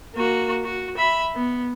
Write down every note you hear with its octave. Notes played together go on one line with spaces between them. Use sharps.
A#3 F#4
F#4
E5 B5
B3